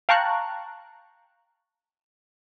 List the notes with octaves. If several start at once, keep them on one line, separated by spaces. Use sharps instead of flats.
F5 G5 A5 A#5 C#6 F#6